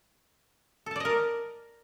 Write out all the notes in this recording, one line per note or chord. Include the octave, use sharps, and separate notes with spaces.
A4 A#4 D5 D#5 A5